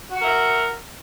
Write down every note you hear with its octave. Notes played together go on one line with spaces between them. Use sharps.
F#4 A#4 E5 F#5